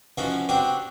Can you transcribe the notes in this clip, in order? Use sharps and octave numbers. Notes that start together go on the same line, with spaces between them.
E3 F3 C#4 D#4 F#4
C4 D4 F#4 G4 D5